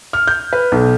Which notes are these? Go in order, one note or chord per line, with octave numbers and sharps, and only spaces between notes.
F6
G6
B4
B1